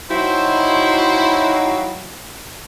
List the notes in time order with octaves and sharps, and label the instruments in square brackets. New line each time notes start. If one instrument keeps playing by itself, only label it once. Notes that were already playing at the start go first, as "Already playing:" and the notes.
[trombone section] F#3 D#4 [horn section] E4 [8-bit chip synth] F#4 F5 G5 [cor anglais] C5